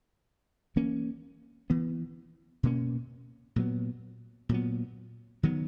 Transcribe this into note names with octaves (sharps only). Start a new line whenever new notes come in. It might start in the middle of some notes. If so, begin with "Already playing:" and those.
E3 A#3 C#4
E3 B3
B2 A#3 C#4
A#2 F#3 B3
A#2 F#3 B3
D#3 F#3 B3